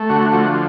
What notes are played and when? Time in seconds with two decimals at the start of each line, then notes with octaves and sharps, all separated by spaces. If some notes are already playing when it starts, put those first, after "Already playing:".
Already playing: A3
0.09 D3 F#4
0.32 F3 F#4